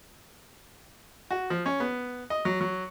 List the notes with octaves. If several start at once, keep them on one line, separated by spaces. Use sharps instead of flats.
F#4
F3
C#4
B3
D#5
F#3
F#3